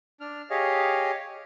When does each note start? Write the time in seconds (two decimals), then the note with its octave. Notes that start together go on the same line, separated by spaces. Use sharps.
0.21 D4 F6
0.50 G4 G#4 C#5 D#5 F5